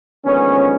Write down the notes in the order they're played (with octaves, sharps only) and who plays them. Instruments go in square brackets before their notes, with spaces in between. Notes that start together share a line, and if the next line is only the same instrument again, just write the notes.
[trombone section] D#2 D3 F3 G#3 B3 C#4